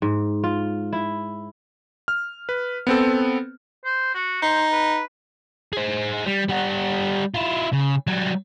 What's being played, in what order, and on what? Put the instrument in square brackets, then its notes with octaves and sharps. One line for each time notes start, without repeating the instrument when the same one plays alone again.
[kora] G#2
F4
E4
[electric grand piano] F6
B4
B3 C4 A4
[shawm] C5
F#4
[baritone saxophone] D#4 [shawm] C5
[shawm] B4
[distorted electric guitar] G#4 C5
G3
G3 F#5
E4 F4
C#3
F#3 G3